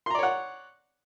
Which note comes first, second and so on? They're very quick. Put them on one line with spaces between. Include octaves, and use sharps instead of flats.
C6 A#5 D5 C#5 F#5